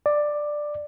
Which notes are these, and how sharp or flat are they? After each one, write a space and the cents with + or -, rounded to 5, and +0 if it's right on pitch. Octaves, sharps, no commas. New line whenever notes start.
D5 +10